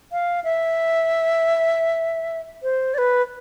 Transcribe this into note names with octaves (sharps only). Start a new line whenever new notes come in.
F5
E5
C5
D5
B4